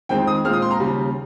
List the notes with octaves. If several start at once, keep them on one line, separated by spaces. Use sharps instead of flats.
F2 D#3 G#3 C4 G5
D#6
A#2 G#3 C4 F4 F6
D#6
C6
A#5
D#2 C#3 G3